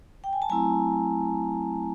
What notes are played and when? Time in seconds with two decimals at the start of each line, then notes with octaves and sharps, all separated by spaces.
0.24 G5
0.33 G#5
0.42 A5
0.49 F#3 A3 C4 E4 G#5 A#5